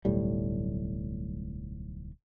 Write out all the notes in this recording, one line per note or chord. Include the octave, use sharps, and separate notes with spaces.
D1 B1 A2 G3